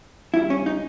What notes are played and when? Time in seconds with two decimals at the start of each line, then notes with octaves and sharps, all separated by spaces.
0.34 G2 G3 E4
0.50 C#4
0.66 D#4